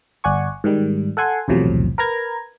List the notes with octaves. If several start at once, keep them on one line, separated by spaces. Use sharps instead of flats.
G1 D5 F#5 G#5 C#6
G#2 D#3 G3
A4 F#5 G#5 C6
B1 E2 A2 C3 F3 F#3
A#4 B4 A#5 G#6